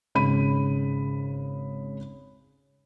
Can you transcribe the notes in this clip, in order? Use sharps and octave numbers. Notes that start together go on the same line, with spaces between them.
G#1 C#3 B5 D#7